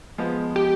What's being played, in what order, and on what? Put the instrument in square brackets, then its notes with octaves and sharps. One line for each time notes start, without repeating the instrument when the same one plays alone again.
[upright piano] F3 G#3 B3
[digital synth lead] G4